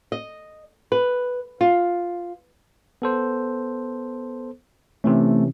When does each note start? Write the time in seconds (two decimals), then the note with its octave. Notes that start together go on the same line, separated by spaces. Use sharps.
0.12 D#5
0.92 B4
1.61 F4
3.02 B3 A4 C5
5.04 C3 E3 A3 C#4